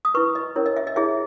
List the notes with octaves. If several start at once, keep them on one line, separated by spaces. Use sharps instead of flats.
D#6
E4 B4 C#6
D#5
C#4 E4 A#4 C#5
D#5
E5
D#5
E4 G#4 C#5 E5